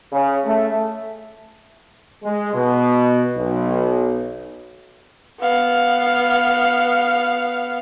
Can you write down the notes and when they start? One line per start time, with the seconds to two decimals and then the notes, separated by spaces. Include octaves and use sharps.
0.13 C#3
0.46 A3
2.23 G#3
2.54 B2
3.37 B1
5.41 B3 F5